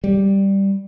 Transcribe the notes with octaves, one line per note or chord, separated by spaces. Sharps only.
G3